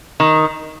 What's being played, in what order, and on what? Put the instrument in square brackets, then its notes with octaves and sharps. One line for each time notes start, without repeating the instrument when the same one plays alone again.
[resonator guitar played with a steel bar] D#3